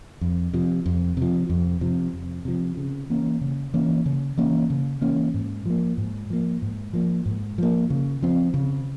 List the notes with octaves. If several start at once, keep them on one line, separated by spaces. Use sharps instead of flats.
F2
C3 F3
F2
C3 F3
F2
C3 F3
F2
C3 F3
C#3
E3 A#3 C#4
C#3
E3 A#3 C#4
C#3
E3 A#3 C#4
C#3
E3 A#3 C#4
G#2
F3 A#3
G#2
F3 A#3
G#2
F3 A#3
G#2
F3 A#3
C#3
F3 C4
C#3